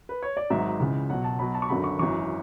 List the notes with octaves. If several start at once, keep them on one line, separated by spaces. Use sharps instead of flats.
B4
C#5
D5
G#1 G#2 F#3 E5
C#2 C#3 E3
B1 B2 F#3 F#5
A5
B1 B2 F#3 B5
A5
C#6
G#1 F#2 D3 F#3 B5
C#6
G#1 F#2 E3 C#6